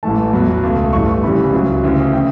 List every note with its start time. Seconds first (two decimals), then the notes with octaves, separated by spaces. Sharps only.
0.03 A1 A2 E3 A3 A5
0.33 E2 B2 F#3 B5
0.63 C#2 B2 A3
0.93 A1 G2 E3 A3 C#6
1.23 D2 C#3 E3 G3 B5
1.53 C#2 C#3 F#3
1.83 D2 C#3 E3
2.13 C#3 G5